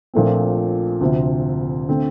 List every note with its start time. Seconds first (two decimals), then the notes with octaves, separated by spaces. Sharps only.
0.14 A#1 A#2 A3 C4
1.01 D2 C3 F3
1.88 D3 A3 C4